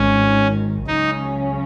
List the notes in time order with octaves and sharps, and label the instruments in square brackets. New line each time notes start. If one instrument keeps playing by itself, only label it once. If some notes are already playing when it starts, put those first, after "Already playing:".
Already playing: [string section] G#1 G#2 D#3 [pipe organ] C#4
[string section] C#2 C#3 F#3 C#4 [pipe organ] D#4